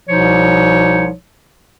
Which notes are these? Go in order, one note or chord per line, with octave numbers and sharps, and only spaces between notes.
C2 B2 F3 D#4 C#5